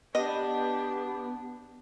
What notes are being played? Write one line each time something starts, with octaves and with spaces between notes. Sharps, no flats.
B3 D4 G4 D#5